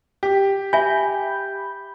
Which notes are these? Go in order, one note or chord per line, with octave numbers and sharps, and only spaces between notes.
G4
E5 G#5 B5 G6